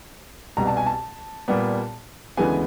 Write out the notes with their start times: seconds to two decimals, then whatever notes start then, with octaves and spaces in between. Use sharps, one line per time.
0.57 C2 B2 G3 A#5
0.67 A5
0.77 G#5
0.86 A5
1.48 A#2 G3 B3
2.37 D2 C#3 E3 G#3 B3 G#5